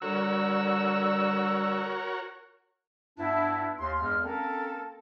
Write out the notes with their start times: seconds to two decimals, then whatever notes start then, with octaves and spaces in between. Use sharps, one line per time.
0.02 D3 G3 F#4 A#4 C#5 E6
3.18 G2 B3 D4 E4
3.79 D#2 C6
3.99 E2 G2 G#3 F6
4.24 A#3 C4 C#4 A4 A#4